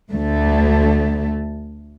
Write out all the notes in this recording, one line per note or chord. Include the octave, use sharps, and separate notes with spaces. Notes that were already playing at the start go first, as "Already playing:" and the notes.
D2 A3